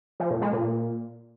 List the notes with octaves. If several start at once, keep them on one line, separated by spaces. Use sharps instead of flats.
F3
A#2
G#3
A#2